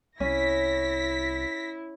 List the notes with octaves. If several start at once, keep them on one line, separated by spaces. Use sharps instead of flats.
C2 C#4 E4 A#6 B6